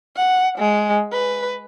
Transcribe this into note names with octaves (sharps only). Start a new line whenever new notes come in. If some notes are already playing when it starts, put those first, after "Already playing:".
F#5
G#3
B4